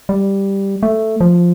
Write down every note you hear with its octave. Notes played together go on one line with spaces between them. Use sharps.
G3
A3
F3